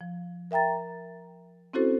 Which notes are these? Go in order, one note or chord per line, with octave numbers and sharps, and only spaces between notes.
F3
A#4 E5 G5 A#5 A6
C4 C#4 E4 F#4 A4 C5